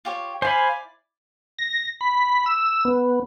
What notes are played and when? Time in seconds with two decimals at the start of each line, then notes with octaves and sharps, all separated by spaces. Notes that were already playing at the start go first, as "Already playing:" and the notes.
0.05 F4 G4 C#5
0.42 E4 C5 D5 F5 G#5 B5
1.59 A#6
2.01 B5
2.46 E6
2.85 B3